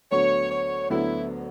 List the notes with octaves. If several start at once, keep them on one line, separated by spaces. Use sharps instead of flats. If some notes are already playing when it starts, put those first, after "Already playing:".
D2 D3 F#3 B3 F#4 C#5
C#5
D2 D3 F#3 B3 E4 F#4